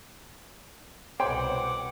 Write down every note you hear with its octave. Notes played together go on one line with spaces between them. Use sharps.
C2 B2 C5 C#5 F#5 G5 C6 D6